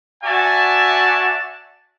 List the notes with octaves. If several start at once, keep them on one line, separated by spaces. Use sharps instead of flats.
F#4 D5 E5 G#5 A5